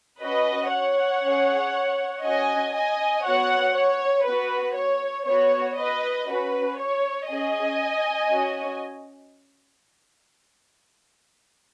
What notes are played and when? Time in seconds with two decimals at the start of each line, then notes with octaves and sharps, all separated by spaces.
0.21 C#4 F#4 B4 D#5
0.72 C#5 F#5
1.22 C#4 G#4
2.23 C#4 F#4 D#5 G#5
2.74 D#5 G#5
3.24 B3 F#4 C#5 F#5
3.74 C#5
4.26 B3 F#4 B4
4.76 C#5
5.26 B3 F#4 C#5
5.77 B4 D#5
6.28 C#4 F#4 B4
6.77 C#5
7.28 C#4 G#4 D#5 G#5
8.30 C#4 F#4